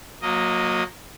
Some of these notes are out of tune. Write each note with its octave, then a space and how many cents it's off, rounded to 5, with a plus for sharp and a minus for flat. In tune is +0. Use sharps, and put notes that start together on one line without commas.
F#3 -30 A#3 +0 D#5 +0